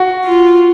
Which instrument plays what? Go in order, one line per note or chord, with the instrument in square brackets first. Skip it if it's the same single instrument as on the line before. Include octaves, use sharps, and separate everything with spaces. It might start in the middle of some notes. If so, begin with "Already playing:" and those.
Already playing: [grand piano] F#4
[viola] F4